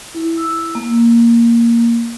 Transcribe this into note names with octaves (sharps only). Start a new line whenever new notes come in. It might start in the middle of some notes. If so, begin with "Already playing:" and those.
E4
E6
A#3